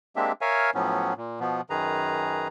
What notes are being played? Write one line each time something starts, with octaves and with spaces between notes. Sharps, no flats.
G#3 A#3 C4 D4 G4 E5
A#4 C#5 E5 F5 G#5
A2 F3 F#3 B3 C#4
A#2
B2 F3 B3
F#2 D#3 G#4 B4 A#5